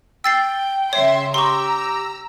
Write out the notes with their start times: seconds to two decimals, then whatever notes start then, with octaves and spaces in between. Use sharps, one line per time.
0.24 G5 E6 A6 C7
0.93 C#3 C#5 E5 C6
1.34 G4 A#5 C6 C#6 E6